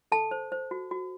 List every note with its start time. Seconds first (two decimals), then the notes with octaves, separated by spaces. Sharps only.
0.12 A4 A5
0.31 C5
0.52 C5
0.71 F#4
0.91 F#4